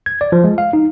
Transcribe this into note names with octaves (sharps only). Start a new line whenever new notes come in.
G#6
D5
F3
G#3
F5
D#4